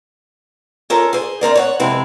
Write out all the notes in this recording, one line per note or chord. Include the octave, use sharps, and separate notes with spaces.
C#4 F4 A4 A#4
G#4 C5
D2 C4 A#4 D5
C#5 D5 F#5
F2 C3 G#3 C4 E4